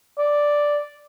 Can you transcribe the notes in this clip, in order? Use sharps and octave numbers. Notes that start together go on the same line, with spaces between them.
D5